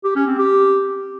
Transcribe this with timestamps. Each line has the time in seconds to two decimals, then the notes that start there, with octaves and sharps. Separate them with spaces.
0.04 G4
0.16 C#4
0.27 C4
0.38 G4